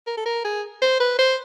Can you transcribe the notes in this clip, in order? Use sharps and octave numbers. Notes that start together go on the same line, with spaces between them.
A#4
A4
A#4
G#4
C5
B4
C5